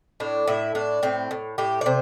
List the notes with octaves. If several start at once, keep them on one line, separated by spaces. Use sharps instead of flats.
A2 D4
A2 E4
A2 D4
A2 C4
A2
A2 G4
D5
C3 C5